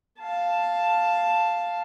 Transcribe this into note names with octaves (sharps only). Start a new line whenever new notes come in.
F5 A5